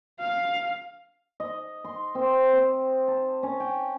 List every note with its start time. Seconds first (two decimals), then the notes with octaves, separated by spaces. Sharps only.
0.20 F5
1.40 D#5
1.84 C6
2.15 C4
2.53 C4
3.08 A5
3.43 C#4
3.60 G5